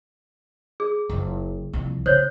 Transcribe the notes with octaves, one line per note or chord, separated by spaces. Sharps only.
G#4
F#1 F4
C2 F3
C#3 C5 C#5